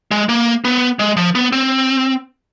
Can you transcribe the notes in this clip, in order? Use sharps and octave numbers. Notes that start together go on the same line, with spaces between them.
G#3
A#3
B3
G#3
F3
B3
C4